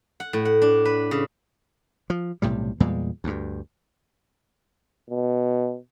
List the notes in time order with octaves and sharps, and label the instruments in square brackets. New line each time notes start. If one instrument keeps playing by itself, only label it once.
[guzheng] F#5
A2
F#5
D4
B4
C#3
[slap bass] F3
B1 A2 C3 G3
E2 A#2 G3 G#3
D2 G2
[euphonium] B2